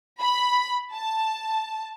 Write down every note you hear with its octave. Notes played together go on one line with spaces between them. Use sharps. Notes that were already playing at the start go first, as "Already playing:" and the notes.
B5
A5